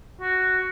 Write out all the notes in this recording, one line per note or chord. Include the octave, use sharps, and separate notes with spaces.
F#4